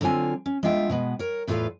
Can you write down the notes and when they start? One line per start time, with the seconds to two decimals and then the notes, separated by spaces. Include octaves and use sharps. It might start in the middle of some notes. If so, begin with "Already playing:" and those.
0.01 D3 F#3 C4 F4 G#5
0.46 C#4
0.63 G#3 B3 D4 F4 E5 G5
0.90 B2 G#3 B3
1.19 A#4 C#5
1.47 E2 A2 F4 A4 B4 F5